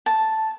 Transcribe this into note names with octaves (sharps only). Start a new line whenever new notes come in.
A5